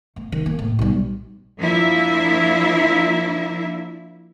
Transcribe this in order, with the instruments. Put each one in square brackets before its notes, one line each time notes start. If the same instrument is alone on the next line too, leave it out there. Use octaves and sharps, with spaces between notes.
[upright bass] A3
D#3
A#3
A2
B1 G3
[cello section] F3 A#3 D4 E4 E5